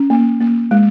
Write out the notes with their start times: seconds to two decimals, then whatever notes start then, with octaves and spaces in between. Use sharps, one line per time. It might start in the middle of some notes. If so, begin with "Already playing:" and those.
Already playing: C#4
0.10 A#3
0.41 A#3
0.71 G#3